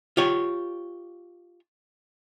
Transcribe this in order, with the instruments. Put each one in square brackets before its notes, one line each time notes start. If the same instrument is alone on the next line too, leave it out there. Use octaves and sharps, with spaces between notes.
[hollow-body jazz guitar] F4 G4 C#5